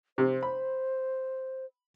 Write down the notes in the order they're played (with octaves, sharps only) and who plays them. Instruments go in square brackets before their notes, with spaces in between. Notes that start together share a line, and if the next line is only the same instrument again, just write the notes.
[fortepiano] C3 [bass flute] C5
[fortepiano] B5